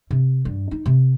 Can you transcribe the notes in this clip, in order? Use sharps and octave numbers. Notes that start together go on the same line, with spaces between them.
C3
G2
D#4
C3